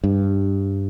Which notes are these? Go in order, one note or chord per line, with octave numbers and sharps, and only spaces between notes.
G2